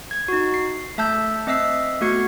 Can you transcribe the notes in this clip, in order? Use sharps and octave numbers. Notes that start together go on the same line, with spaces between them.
G#6
D#4 F#4
C7
A3 E5 A5 E6 G6
C4 D#5 E5 E6 C7
A3 B3 F#4 G#6 C#7